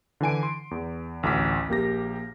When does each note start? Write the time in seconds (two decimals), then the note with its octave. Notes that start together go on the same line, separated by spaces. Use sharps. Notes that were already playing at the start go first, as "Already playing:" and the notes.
0.21 D3 E3 G#5 D7
0.43 C6
0.71 E2
1.23 A1 D2 A2 D6 B6
1.68 A#1 A#3 G4 A#6